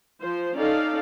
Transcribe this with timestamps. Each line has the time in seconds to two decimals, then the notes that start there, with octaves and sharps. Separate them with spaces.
0.22 F3 C5
0.56 C#4 D#4 A4 D5 F5